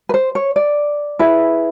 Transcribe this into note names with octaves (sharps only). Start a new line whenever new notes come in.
B4
C5
C#5
D5
E4 G#4 B4